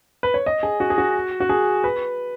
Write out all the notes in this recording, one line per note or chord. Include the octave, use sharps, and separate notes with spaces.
B4
C#5
D#5
G#4
F#4
G#4
F#4
F#4
G#4
B4